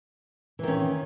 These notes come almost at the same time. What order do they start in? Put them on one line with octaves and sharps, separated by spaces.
E3 D#3 C#4